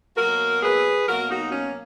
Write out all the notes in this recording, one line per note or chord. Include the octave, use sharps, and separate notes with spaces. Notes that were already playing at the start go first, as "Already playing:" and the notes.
B2 F#3 A#3 F#4 A#4
G#4 B4
B2 F#3 A#3 F#4 A#4
D#4 F#4
C#4